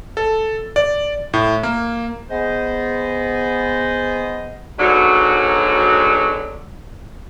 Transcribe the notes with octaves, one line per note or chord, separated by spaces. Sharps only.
A4
D5
A2
A#3
B3 G#4 C5 D#5
G#2 B2 D3 F#3